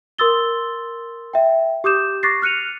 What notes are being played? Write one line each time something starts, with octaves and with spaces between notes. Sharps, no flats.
A#4 C6 D#6 E6 A6 G7
E5 G5
G4 D6 D#6 G6 E7
C#6 D6 F#6 A6 A#6 C7
F6 F#6 C#7 D#7 F7